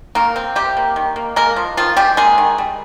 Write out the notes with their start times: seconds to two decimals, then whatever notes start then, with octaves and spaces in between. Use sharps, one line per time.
0.15 D#3 A#3 A#4
0.36 C4
0.55 C3 G3 G4
0.77 A#3
0.96 D#3
1.16 A#3
1.36 G#3 A#3 A#4
1.56 F3
1.77 D#3 F3 F4
1.97 G3 G#3 G4
2.17 G#3 A#3 G#4
2.38 D#3
2.58 G3